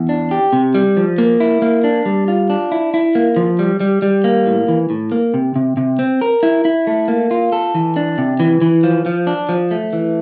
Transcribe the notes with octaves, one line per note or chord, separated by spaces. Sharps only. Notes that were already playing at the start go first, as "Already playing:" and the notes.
Already playing: E2
D4
G4
C3
G3
F3
A#3
E4
A#3
D4
G3
F4
D4
E4
E4
A#3
F3
G3
G3
G3
A#3
A2
E3
A2
A#3
C3
C3
C3
C4
A#4
E4
E4
A3
A#3
F4
A4
E3
D4
C3
E3
E3
F3
F3
D4
F3
A3
E3